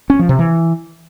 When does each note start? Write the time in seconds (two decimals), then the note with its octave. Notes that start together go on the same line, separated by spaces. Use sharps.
0.10 C#4
0.19 F3
0.29 C3
0.39 E3